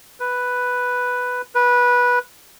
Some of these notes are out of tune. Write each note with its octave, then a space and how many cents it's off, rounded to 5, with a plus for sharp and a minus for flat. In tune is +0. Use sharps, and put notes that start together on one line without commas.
B4 +0
B4 -15